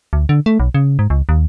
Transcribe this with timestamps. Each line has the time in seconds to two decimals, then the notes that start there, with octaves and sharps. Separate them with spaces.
0.13 D2
0.29 D3
0.46 A3
0.60 B1
0.75 C#3
0.99 G#2
1.10 C#2
1.29 D#2